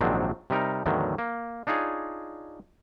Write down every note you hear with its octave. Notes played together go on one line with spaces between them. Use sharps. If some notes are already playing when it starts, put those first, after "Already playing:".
A#1 G#2 D#3 F#3 C4 D4
C3 G3 D#4 A#4
E2 A2 D3 D#3 F#3
A#3
D4 D#4 F4 G#4 C#5